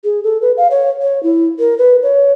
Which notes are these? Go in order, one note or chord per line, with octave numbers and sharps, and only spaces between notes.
G#4
A4
B4
F5
C#5
C#5
E4
A#4
B4
C#5